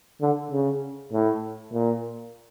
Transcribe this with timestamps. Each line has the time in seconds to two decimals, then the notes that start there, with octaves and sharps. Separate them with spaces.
0.21 D3
0.51 C#3
1.12 A2
1.73 A#2